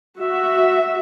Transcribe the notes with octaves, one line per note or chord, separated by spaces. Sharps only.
F#4 E5